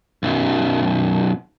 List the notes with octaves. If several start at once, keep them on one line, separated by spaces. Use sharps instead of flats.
B1 F#2